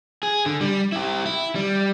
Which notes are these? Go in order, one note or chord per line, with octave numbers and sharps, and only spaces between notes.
G#4
D3
G3
E4 G4
E4
G3